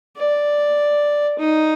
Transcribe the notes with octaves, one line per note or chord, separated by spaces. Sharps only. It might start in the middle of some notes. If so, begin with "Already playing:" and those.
D5
D#4